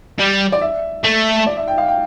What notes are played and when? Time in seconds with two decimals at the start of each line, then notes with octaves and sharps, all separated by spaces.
0.19 G3
0.52 D5
0.61 E5
1.04 A3
1.46 D5
1.57 E5
1.68 G5
1.78 F5
1.88 G5